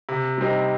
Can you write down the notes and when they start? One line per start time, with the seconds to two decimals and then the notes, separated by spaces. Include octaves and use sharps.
0.09 C3
0.38 G3 C4 D#4